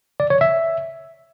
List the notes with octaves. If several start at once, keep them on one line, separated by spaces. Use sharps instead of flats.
D5
C#5
E5